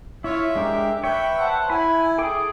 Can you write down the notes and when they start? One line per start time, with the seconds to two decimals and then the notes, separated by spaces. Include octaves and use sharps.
0.24 E4 F4 C#5 E5
0.56 G#3 D4 G4 A#4
1.04 B4 C#5 E5 G5
1.38 C5 F#5 A5
1.70 E4 G#5 B5
2.18 G#4 A4 G5 D6